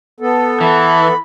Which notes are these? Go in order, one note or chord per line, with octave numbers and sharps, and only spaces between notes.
B3 A4
E3 B5